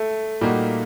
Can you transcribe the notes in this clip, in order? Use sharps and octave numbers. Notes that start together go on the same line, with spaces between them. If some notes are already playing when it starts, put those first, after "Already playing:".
Already playing: A3
A#2 G3 A#3 D#4 F#4